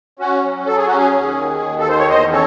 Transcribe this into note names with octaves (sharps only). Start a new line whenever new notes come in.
C#4 F#4
F#3
F#3 A4
G#4
C#4 F#4
G#4
D#2
D#3
D#2
A4
D#3 C5
C#5
E2 C5 D#5
C#4 A4 C#5